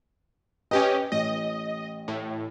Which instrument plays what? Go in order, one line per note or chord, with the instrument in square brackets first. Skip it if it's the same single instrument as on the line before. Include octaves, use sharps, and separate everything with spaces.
[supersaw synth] C#4 G4 D#5 [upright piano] B4 G5
[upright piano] A1 [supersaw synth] D#5
[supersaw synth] A2